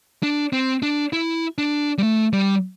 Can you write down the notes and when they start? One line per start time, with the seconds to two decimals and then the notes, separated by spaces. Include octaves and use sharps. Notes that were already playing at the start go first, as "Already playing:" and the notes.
0.23 D4
0.53 C4
0.83 D4
1.13 E4
1.58 D4
1.98 G3
2.03 A3
2.33 G3